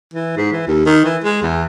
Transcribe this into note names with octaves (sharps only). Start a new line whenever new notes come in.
E3
G#2
E3
D#2
D#3
E3
G#3
E2